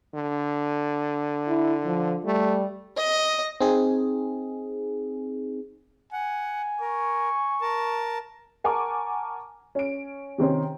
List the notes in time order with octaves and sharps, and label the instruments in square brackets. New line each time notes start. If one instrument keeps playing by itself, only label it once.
[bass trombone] D3
[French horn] E4
F3
[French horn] G3 [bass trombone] A3
[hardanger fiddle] D#5
[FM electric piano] C4 D#4 G#4
[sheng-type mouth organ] F#5 [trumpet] G#5
[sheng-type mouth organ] A#4 [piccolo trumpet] C#6
[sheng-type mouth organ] A#4 A5
[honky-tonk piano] A#4 F#5 G#5 A5 C#6 D6
C#4 D7
C3 D#3 C4 C#4